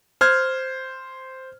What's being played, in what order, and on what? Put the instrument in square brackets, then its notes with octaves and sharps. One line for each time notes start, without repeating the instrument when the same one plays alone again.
[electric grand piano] C5 F6 G#6